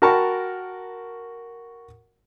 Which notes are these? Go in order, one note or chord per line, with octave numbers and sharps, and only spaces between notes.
F#4 A#4 G5 A5 B5 C#6